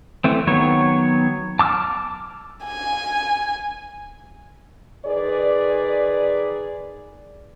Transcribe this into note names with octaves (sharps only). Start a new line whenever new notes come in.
E3 A3 C4
D#3 F#3 B3 C#5
A5 D6 E6 F6
G#5
D#3 G#4 B4 D5